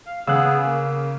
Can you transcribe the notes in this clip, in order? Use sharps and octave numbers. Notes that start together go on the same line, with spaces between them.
F5
C#3 B3 G#4 F5 E6 F#6
A#3